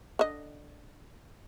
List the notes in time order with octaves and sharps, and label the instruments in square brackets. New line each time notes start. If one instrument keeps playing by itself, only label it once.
[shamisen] D3 D#5